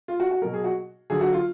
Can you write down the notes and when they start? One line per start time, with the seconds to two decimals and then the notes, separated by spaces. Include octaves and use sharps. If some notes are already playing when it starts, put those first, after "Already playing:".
0.08 F4
0.20 F#4
0.31 F#4
0.42 B2 F#3 A#4
0.54 G#4
0.64 F#4
1.10 D3 F#3 G#4
1.21 F#4
1.33 F4